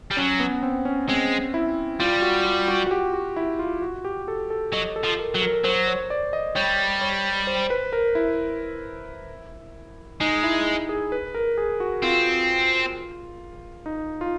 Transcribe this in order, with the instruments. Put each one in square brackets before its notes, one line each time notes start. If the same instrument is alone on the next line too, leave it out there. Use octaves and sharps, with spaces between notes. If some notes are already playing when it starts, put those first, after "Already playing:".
[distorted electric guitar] G3
[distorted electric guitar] F#3 [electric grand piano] C#4
[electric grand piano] B3
C4
C#4
[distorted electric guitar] G#3 [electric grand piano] C4
[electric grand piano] E4
[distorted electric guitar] G3 [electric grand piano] F4
[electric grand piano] F#4
F4
F#4
F#4
G4
F#4
E4
F4
F#4
G4
A4
A4
[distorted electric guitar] F#3 [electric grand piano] D#5
[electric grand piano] A4
[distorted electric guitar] F3
[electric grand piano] A#4
[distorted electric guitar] F#3
[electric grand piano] A#4
[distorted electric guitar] F#3 [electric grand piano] C5
[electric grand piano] C#5
D5
D#5
[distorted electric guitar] G3 [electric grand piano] C#5
[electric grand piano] C#5
C5
B4
A#4
E4
[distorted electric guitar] G#3 [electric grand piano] D#4
[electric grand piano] E4
G#4
B4
A#4
G#4
F#4
[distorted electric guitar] C4 [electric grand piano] F4
[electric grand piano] D#4
F4